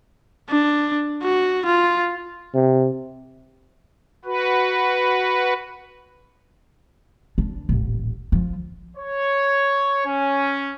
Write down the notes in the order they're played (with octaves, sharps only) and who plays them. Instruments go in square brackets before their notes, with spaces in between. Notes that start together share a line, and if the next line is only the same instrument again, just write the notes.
[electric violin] D4
F#4
F4
[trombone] C3
[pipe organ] F#4 B4
[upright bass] E2 D4
D#1 A1
F3
[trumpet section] C#5
C#4